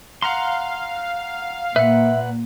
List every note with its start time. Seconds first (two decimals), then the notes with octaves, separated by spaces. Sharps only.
0.22 F5 F#5 A#5 C6
1.76 A#2 B4 E5 F#5